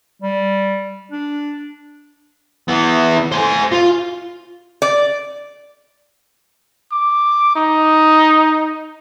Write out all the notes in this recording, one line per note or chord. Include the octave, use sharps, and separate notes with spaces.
G3
D4
E3 B3
C5 G#5
F4
D5
D6
D#4